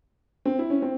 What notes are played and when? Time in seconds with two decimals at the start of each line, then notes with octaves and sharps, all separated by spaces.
0.45 C4
0.59 E4
0.70 C#4
0.82 C4